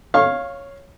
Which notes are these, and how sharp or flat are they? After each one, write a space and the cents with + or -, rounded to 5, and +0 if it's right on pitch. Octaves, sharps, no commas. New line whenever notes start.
C#5 +0 F5 +0 C#6 -30